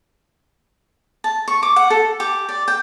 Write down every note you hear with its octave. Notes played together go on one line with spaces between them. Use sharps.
A5
C#6
D6
F#5
A4
G4
D5
G5